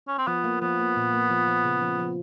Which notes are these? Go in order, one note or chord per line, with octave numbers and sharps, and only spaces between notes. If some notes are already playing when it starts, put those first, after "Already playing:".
C#4
C4
F3 B3
A#3
F3 B3
A#3
A#2
A#3
F3
F3
C#3
F3
F3